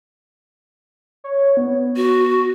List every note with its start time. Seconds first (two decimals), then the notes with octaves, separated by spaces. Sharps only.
1.24 C#5
1.57 B3
1.96 F#4